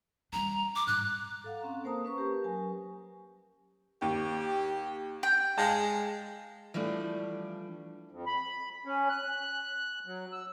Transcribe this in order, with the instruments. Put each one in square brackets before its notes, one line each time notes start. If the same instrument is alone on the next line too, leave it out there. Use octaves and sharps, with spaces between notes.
[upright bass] G3 D4 [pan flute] A#5
[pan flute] D6
[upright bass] G#2 [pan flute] F#6
[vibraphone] A4 F5 F#5
C4 C#4 F5 A#5
A#3 A#4 C5 A5 A#5 D#6
C#4 B4 C#6
G4 A#4 B4
F#3 A#4 G#5
[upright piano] D#2 [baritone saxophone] G4
[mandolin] G5
[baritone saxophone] G#3 [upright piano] F5 A5 A#6
[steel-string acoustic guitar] E3 F3 G3 A3 D4
[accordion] F2
B5
C#4
F#6
F#3
E6